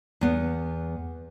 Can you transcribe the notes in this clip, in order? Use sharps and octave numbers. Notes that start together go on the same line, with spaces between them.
E2 B3